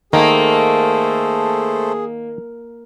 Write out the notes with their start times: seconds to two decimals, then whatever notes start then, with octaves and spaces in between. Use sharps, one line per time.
0.13 D#3 A3 A#3 G#4 A4 C5